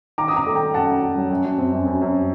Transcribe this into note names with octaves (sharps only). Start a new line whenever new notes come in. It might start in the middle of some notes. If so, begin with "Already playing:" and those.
D#3 A#5 D6
D#6
D#3 A#5 D6
A3
G5 A#5
A3
F#2 F#5 A5
F#2
F#2
F#3
F#2
F#2
C4
F#2
F#2
F#2